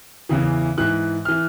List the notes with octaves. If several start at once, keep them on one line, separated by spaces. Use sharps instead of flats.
E2 C#3 E3
G#2 E3 F#6
F6
E3